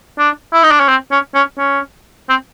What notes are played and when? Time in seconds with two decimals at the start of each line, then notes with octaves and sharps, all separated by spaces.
0.18 D4
0.53 E4
0.63 D#4
0.71 D4
0.80 C#4
0.88 C4
1.11 C#4
1.35 C#4
1.58 C#4
2.29 C4